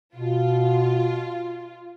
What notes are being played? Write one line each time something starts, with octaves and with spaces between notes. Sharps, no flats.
B2 F4